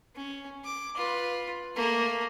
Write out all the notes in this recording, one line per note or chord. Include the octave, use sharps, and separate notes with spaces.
C#4
D6
F4 B4
A3 A#3